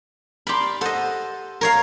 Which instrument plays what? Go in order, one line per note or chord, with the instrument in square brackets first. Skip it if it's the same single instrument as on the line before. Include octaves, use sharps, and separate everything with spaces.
[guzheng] G4 B5 [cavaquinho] A#4 D5 C6
[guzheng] A4 D#5 [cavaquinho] C5 F#5
[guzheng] A#4 C#5 F5